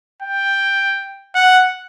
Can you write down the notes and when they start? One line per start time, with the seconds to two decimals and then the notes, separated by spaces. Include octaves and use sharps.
0.22 G5
1.35 F#5